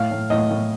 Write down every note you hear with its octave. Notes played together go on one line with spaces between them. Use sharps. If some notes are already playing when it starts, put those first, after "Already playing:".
Already playing: A2 F5
A2
A2 D#5
A2